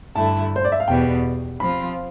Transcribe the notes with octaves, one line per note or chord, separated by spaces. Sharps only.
G2 D3 A3 E4 A5
C5
D5
E5
F5
E2 B2 G3 B3 G5
F3 C4 F4 B5